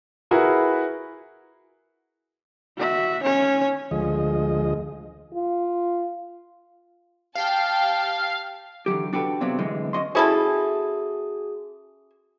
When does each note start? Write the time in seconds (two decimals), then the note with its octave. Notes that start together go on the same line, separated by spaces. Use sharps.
0.31 E4 F#4 G#4 A#4 B4 B5
2.78 F#4 E5
3.23 C#4 C#5
3.91 D2 F3 G#3 D#5
5.34 F4
7.35 G4 F5 G5 A5
8.86 D3 E3 F#3 G4
9.13 D4 F#4 G4 A4 B4
9.41 C3 F#3 B3 C4 D4 F4
9.58 F#2 A2 D3 E3 G#3
9.93 C#4 F#4 D#5 C6
10.15 C#4 E4 F#4 G#4 A4 D#6